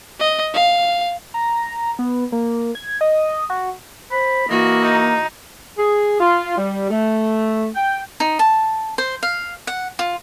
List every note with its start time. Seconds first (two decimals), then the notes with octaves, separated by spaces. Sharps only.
0.20 D#5
0.54 F5
1.34 A#5
1.99 B3
2.32 A#3
2.75 G#6
3.01 D#5
3.50 F#4
4.11 C5 B5
4.49 E3 A#3 F#4 D#5
4.83 D#4
5.78 G#4
6.20 F4
6.57 G3
6.90 A3
7.75 G5
8.20 D#4
8.39 A5
8.98 C5
9.23 F5
9.67 F#5
9.99 F4